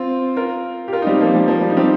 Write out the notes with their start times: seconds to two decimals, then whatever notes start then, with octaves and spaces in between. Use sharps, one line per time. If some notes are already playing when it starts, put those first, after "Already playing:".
Already playing: C4 F4
0.36 F4 A#4
0.88 G4
0.93 F4 A#4
1.02 D#4
1.07 G3 C4
1.21 F3 A#3
1.35 G3
1.48 F3
1.61 G3
1.70 D#4
1.77 G3 C4